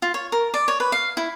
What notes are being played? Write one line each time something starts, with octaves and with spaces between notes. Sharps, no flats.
F4
C#5
A#4
D5
C#5
B4
F5
E4